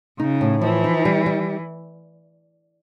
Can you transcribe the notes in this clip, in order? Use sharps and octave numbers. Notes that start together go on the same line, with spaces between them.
C#3 D#4
A2
E3 F3
D#4
G3
G3